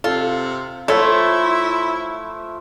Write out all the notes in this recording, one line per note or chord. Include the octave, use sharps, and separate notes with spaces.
C3 F4 A4
A3 E4 F4 A4 C5 C#5 E5